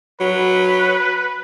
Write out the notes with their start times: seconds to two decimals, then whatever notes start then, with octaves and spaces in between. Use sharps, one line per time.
0.21 F#3 B4